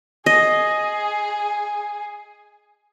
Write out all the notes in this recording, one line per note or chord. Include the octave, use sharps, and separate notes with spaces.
G#4 D#5